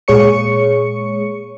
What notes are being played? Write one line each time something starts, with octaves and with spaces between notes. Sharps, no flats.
A#2 G#3 G#4 C#5 C#6 C#7